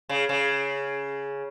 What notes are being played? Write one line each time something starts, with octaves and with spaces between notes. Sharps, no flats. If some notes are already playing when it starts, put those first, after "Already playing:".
C#3
C#3